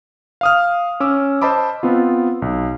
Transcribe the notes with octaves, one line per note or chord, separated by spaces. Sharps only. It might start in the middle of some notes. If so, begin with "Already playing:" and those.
F5 D#6 F6
C#4 D6 E6
C5 D#5 A5 B5 D6
B3 C4 F4
B1